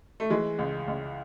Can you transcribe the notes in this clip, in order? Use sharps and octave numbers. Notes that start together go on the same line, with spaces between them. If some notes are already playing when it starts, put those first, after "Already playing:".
A3
E3 G#3
C#2
C#2